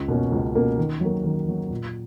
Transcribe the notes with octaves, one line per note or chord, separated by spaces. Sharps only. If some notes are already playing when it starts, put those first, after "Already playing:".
Already playing: C#2
B2 A#3 C#4
C#2
B2 A#3 C#4
D#3
F#3 A#3
D#3
F#3 A#3
A#2